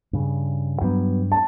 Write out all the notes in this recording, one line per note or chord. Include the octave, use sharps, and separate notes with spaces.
G2 C#3
G2 F#3 B3
A5